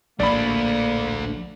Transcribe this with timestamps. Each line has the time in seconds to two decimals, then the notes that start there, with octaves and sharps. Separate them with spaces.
0.20 A#1 A2 A3 A#3 D4 D5 B5